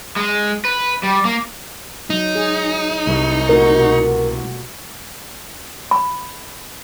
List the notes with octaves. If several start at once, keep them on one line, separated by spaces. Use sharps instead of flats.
G#3
B4
G3
A#3
F#3 D#4
G#4
C2
A#2 A3 F#4 A#4
B2 F#4
B5